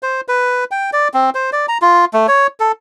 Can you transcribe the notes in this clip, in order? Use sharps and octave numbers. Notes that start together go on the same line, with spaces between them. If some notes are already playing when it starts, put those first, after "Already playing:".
C5
B4
G5
D5
C4
C5
D5
A#5
F4
A3
C#5
A4